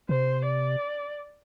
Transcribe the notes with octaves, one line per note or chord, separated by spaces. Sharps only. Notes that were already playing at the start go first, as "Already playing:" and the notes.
C3 C5
D5